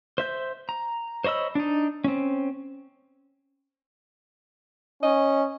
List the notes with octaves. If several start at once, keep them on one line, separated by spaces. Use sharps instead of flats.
C5 E5 G6
A#5
C5 C#5 D#5 B5 E6
D4 D#4
C4 C#4
C#4 D#5